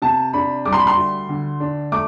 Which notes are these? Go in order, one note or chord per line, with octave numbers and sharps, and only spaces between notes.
C3 A5
D4 B5
G3 D6
C6
B5
C6
D2
D3
D4
A3 D6